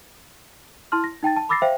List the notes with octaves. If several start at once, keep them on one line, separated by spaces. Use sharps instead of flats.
E4 A5 C6 F6
A#6
D#4 G5 A5 A6
A5
B5 D6 E6 A6 A#6 C7
C5 E5 F5 G5